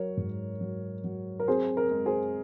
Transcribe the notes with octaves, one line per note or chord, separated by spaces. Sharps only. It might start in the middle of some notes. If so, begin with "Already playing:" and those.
Already playing: F#3 A#4 C#5
G#2
F#3
F#3
A#4
C4 G#4 C5
A#4
G#3
G#4 C5